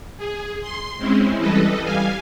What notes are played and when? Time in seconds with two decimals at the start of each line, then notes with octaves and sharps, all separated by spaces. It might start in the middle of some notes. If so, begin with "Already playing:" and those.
0.17 G#4
0.61 C6
0.97 G#3 C4 C#4 E4
1.38 E3 G3 A4 B4 D#5
1.82 G3 F5 G#5